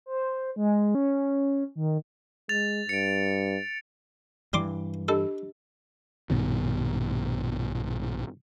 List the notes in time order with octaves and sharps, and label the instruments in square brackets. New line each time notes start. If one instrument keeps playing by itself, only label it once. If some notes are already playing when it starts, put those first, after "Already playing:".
[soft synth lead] C5
G#3
C#4
D#3
[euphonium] G#3 [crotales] A6 F7
[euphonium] G2 [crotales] C#7 D7
[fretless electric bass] G2 E3 [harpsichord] G3 C6 D6
[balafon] D4 G4 D#5 [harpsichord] A4
[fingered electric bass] A#1 G2 B2 D#3